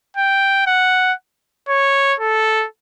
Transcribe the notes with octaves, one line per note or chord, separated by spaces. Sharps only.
G5
F#5
C#5
A4